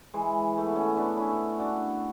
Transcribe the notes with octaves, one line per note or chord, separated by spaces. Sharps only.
E3 G#3
A3
B3
A3 C#4
B3 D4
C#4 E4
D4 F#4